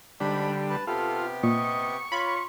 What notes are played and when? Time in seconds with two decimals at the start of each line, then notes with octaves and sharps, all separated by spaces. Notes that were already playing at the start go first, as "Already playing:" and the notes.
0.20 G#2 D3 G3 D4 B5
0.70 B4 A5
0.87 C3 B3 F4 G4 A4
1.43 A#2 D#5 C#6
2.12 F4 C#5 B5